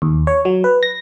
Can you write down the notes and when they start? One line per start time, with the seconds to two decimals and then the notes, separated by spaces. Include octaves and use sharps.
0.02 D#2
0.27 C#5
0.45 F#3
0.64 B4
0.83 A#6